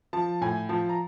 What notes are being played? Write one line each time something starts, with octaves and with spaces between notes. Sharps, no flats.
F3 A5
A2 G#5
F3 A5
A#5